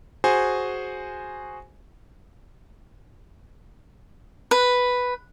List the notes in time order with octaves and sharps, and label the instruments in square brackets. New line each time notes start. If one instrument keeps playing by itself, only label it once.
[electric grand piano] F#4 G#4 C5 G#5
[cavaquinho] B4